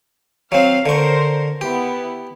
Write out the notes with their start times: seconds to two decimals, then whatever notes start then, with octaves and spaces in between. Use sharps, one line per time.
0.52 F#3 C4 F5
0.86 D3 A#4 C5 C#6
1.61 B3 E4 G4